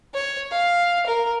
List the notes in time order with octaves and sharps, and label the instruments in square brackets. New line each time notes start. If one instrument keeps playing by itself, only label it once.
[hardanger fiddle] C#5
F5
A#4